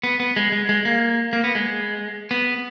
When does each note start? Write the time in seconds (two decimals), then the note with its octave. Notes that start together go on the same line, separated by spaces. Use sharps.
0.04 B3
0.20 B3
0.36 G#3
0.52 G#3
0.69 G#3
0.85 A#3
1.33 A#3
1.44 B3
1.55 G#3
2.31 B3